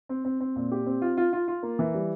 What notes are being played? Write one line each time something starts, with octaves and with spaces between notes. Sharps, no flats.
C4
C4
C4
A#2
G4
C4
F4
F4
F4
F4
A#3
E3
G3